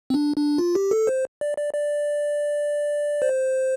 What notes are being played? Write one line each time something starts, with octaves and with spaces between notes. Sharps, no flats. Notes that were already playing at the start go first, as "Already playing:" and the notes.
C4
D4
D4
F4
G4
A4
C5
D5
D5
D5
C5